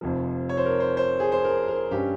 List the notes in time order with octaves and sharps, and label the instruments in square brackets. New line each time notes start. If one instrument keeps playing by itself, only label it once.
[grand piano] F1 F2 C3 F3
C#5
C5
A#4
C5
C5
G#4
C5
A#4
A#4
G2 G3 C#4 G4